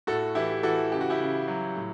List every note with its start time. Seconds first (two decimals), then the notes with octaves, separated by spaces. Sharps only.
0.07 A2 F#4 A4
0.35 E3 E4 G4
0.63 E3 F#4 A4
0.92 C#3 G4
1.01 F#4
1.10 E4 G4
1.20 C#3
1.48 F#3
1.76 A2